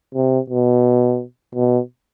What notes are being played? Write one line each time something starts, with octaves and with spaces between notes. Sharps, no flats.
C3
B2
B2